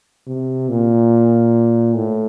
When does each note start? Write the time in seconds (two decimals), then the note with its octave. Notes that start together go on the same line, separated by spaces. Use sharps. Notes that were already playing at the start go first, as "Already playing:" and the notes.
0.27 C3
0.69 A#2
1.96 A2